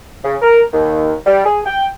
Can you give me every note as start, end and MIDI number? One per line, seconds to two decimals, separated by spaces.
0.24 0.36 49
0.42 0.61 70
0.72 1.13 39
1.27 1.45 55
1.45 1.60 68
1.65 1.86 79